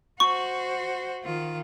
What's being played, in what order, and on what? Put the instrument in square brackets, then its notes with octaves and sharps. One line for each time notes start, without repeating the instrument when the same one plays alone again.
[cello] F#4 C5 [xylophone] C#6
[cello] D#3 F4